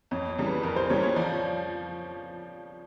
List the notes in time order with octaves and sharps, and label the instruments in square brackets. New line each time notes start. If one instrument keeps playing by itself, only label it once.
[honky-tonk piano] F2 [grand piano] C#5
[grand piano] C#5
[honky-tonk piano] C#3 E3 G3
[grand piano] B4
[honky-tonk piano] F2 [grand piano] A#4
[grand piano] C5
[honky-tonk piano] C#3 E3 G3 [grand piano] C#5
[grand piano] C#5
[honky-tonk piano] F3 [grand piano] D5
[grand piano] C#5